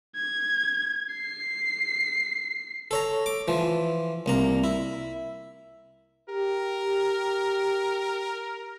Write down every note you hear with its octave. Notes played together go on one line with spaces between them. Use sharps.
G#6
C7
A4 C#5 A#5
D6
E3 F3
C2 A#3 A#5
E4
G4 A#4